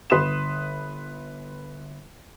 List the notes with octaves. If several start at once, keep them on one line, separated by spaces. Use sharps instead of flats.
G1 B4 C6 D#6 E7